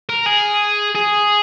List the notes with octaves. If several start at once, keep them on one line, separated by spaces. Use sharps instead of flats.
A#4
G#4
G#4